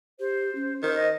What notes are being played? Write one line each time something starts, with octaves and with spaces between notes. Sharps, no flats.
G4 C5
C#4
D#3 C5
C5 D#5